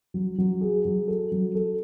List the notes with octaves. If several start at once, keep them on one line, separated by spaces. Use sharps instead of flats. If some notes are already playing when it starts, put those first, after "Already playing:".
F#3
F#3
G#4
F#3
A4
F#3
A4